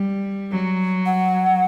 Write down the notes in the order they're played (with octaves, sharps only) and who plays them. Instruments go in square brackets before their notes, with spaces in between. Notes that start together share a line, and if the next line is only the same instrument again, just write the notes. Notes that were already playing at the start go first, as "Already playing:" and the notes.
Already playing: [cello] G3
F#3
[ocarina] F#5